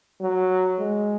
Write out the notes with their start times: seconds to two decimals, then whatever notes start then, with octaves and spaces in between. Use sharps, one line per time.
0.21 F#3
0.79 G#3